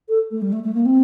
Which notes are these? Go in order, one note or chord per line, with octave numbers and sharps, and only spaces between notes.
A4
A3
G3
A3
A3
A#3
C4